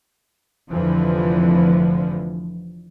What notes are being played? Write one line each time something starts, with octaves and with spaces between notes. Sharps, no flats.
F1 F2 D3 E3 F3